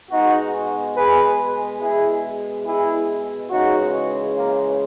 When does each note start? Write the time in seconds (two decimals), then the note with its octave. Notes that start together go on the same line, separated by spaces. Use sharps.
0.10 B2 G#3 D#4 F#4
0.96 G#4 B4
1.80 B2 G#3 E4 G#4
2.65 E4 G#4
3.50 C#3 E3 G#3 D#4 F#4
4.36 A#3